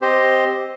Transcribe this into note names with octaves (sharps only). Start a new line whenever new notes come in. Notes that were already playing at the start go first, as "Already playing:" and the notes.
C4 G4 C5 D#5